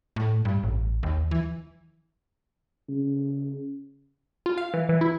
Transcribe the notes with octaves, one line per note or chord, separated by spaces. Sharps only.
A2
G2
A1
D#2
E3
C#3
F4
F5
E3
E3
E4